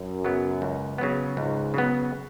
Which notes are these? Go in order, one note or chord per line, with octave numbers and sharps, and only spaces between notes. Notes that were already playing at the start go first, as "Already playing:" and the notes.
Already playing: F#2
C#3 F#3 B3
C#2
C#3 F#3 B3
C#2 G#2
C#3 F#3 B3